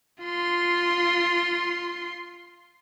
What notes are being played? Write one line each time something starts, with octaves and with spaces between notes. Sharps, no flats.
F4 C6